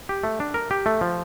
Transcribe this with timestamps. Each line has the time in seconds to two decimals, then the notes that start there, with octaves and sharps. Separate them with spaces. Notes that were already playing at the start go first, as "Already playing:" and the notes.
0.09 G4
0.24 A3
0.40 D4
0.54 A#4
0.71 G4
0.86 A3
1.01 F3